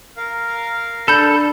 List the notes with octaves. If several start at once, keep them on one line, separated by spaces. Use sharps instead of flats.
A#4 F5
D4 A4 B5 G6